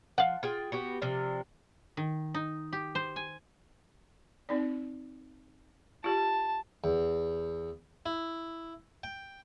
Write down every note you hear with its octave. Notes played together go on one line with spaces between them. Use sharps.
F3 F5 F#5
F4 G#4 G5
B3 F#4 G4
C3 F3 D4
D#3
D#4
G4
C5
G#5
C4 D#4 D5
F4 G4 A5
E2
E4
G5